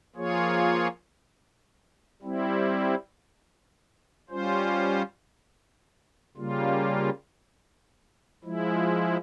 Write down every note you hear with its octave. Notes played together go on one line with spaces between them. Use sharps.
F3 A#3 F4 G#4 C#5
G3 C4 E4
G3 C#4 F4 C5
C#3 G3 A#3 F4
F3 G#3 E4